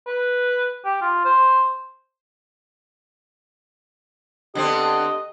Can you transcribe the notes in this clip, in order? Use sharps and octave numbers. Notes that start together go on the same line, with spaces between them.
B4
G4
F4
C5
D3 B3 C4 G4 D#5